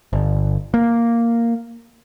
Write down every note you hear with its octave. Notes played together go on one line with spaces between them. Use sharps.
G1
A#3